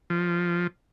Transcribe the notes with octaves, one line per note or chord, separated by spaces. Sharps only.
F3